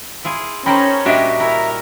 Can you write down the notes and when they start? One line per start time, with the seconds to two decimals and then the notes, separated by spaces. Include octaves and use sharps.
0.24 E4 F4 G#4
0.66 C#4 D#4 A#4 C5 G5 B5
1.06 A#2 G3 D4 F#4 G4 D#5 E5
1.40 E4 A#4 A#5